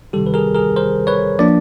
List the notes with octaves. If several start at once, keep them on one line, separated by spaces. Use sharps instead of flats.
C3 D#3 G3 G4 A4
B4
G#4 A#4
G#4 A#4
A#4 C5
B4 C#5
F3 A#3 D4 D5